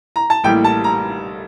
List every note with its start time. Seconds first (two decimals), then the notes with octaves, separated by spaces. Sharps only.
0.16 A#5
0.30 A5
0.44 A1 A2 G3 A#3 G5
0.64 A5
0.84 A#5